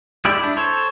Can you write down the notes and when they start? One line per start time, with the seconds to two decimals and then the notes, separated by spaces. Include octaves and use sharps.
0.25 G#3 E4 G4 D5
0.39 D4 E4
0.57 A4 C5 C#5